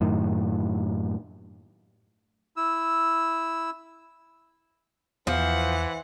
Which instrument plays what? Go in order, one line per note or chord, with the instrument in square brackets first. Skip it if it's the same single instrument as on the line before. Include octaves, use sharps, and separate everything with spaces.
[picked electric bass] F#2 A2 D#3
[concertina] E4 E6
[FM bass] E2 [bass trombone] E3 [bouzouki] F3 [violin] C5 F#5